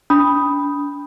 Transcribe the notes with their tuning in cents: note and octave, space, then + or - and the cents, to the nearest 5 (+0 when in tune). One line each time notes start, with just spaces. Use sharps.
D4 -35 B5 +0 D#6 +0